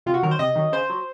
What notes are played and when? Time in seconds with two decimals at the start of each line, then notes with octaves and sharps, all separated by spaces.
0.06 C3 F4
0.14 F#4
0.23 D#3 F#3 A#4
0.31 C5
0.39 C3 D#5
0.55 D#3 F#3
0.72 C#3 C5
0.90 F#3